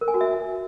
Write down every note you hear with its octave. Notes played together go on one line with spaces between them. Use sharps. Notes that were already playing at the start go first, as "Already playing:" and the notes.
A#4
G#5
F#4
E5